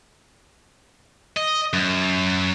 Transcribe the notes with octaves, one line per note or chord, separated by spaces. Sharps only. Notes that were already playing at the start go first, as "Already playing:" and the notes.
D#5
F#2